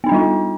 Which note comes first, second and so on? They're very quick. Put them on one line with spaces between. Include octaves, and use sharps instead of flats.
B3 D#4 D4 G3 F4